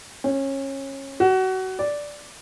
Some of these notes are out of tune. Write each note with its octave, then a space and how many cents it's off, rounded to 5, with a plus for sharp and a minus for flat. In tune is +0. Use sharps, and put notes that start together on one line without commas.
C#4 -25
F#4 +25
D5 -5